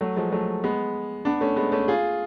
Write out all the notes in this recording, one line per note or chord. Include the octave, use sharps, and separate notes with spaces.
F#3 A3
F3 G#3
F#3 A3
G#3 B3
B3 D4
A3 C#4
G#3 B3
A3 C#4
F4 G#4